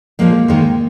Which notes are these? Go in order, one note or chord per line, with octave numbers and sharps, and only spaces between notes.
A#2 F3 G#3 A#3
G#2 D#3 G#3